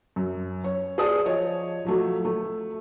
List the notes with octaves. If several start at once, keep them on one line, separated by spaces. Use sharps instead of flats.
F#2
C#5
G#4 C5 D5 A5 D#6
F3 C#5 D#5
F3 F#3 A3
A3